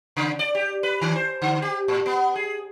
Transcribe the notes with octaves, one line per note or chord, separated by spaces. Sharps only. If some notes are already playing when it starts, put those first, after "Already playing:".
C#3
D5
G4
B4
D#3
C5
D3
G4
A2
B3
G#4